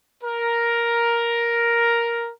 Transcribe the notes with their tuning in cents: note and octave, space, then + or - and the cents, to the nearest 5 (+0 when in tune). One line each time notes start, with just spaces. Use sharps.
A#4 +5